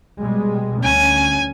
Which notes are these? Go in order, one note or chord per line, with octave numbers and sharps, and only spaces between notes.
B2 G3 G#3
D2 C#4 G#5